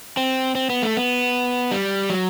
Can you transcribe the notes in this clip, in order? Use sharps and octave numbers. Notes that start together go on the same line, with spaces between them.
C4
C4
B3
A3
B3
G3
F#3